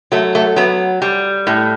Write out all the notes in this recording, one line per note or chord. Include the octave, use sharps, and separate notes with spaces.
F#3 A3
A3
F#3 B3
G3
A2